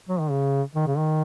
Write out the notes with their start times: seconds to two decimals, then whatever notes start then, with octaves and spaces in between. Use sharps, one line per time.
0.09 F#3
0.20 D#3
0.31 C#3
0.75 D#3
0.87 C#3
0.98 D#3